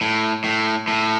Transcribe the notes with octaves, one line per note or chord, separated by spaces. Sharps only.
A2
A2
A2